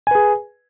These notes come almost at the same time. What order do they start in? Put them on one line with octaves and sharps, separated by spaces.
G#5 B4 G#4